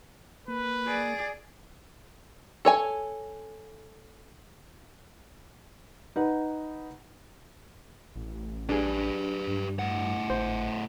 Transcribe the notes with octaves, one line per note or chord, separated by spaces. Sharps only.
A#3 B4
G#4 D5
A4 C#5 G#5
D#4 B4 F#5
A1
D4 G4 G#4 B4
G2
A2 F#5
G#1 C5